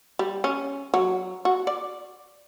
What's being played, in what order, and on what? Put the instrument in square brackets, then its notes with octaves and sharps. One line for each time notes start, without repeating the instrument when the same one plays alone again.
[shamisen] G3
C#4
F#3
F#4
D5